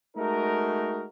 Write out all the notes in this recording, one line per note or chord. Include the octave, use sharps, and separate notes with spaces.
G#3 A3 D#4 F#4 A#4